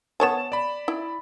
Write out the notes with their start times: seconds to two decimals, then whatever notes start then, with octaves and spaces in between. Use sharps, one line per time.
0.20 B3 C#5 G#5 A5 E7
0.52 D5 B5
0.88 E4